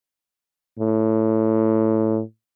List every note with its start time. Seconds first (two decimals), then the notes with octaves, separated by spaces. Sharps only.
0.79 A2